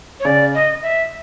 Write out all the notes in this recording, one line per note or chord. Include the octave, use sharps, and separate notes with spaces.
C#5
C#3 D5
D#5
E5